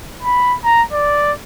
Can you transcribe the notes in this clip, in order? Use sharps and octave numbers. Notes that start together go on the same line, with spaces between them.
B5
A#5
D5